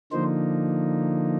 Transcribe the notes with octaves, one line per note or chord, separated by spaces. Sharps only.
D3 F3 A#3 D#4 C5